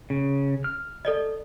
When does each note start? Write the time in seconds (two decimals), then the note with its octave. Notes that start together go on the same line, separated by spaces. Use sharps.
0.10 C#3
0.64 F6
1.05 A4 D5 D#5